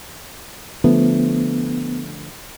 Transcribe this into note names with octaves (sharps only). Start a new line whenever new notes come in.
D3 F3 A3 B3